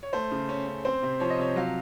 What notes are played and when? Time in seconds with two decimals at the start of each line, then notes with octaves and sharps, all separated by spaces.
0.03 C#5
0.13 A3 C5
0.31 C#3
0.49 C#4
0.67 C#4
0.85 C4 C5
1.02 C3
1.20 F3 C#5
1.30 D#5
1.38 C3 C#5
1.56 F#3 F5